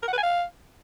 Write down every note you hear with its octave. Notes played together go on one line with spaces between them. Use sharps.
A#4
F#5
B4
G#5
F5